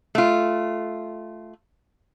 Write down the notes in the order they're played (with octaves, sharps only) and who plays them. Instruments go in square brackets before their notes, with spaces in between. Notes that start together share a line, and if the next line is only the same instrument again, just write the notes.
[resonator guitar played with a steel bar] A3 F4